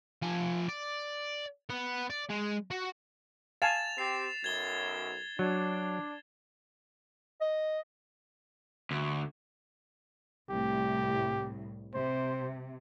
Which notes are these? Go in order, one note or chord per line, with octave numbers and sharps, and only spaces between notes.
F3 G#5
D5
B3
D5
G#3
F#4
F5 G#5 A5 A6 E7 F7
C4 G4 C7
B1 F#2 G#6 G7
F#3 D4
D#5
D2
C2 A2 G4
C3 C5